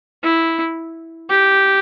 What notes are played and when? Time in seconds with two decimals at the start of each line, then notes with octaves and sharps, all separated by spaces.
0.23 E4
1.30 G4